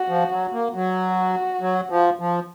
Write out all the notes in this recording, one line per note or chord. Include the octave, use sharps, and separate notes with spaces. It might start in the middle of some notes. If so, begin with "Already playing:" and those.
Already playing: F#4
F3
F#3
A#3
F#3 F#4
F#3
F3
F3